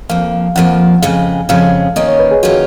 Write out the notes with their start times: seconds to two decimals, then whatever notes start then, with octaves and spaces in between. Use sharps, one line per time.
0.09 F2 F3 A#3 F5
0.56 F2 F3 A#3 F#5
1.02 F2 C#3 G#3 F5
1.49 F2 C#3 G#3 F5
1.96 D#3 A#3 C#4 F4 D#5
2.08 C#5
2.19 B4
2.31 G#4
2.43 D#3 A#3 C#4 F4 F#4